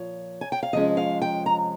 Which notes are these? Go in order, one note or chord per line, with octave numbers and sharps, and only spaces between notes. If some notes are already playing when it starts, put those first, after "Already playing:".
Already playing: A#2 F3 C#5
G#5
G5
F5
F2 C3 F3 G#3 C#4 D#5
F5
G5
A#5